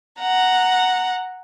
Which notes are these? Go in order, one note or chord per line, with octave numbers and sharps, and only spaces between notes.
F#5 A#5